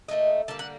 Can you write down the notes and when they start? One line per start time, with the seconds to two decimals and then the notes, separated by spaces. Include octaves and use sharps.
0.08 A#2 A3 D#4 D#5
0.48 D3 G3 A#3 A5
0.59 F#5